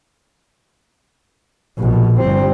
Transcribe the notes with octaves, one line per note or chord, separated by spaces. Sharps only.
A#1 B2
G1 C4